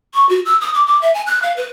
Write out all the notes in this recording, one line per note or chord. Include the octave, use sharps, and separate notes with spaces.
C#6
F#4
E6
D#6
D6
D6
E5
G#5
F#6
F5
B4